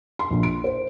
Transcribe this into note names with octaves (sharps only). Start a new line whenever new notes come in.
C6
A#1
D7
C5